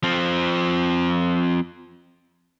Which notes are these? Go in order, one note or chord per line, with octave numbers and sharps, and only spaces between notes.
F3 C4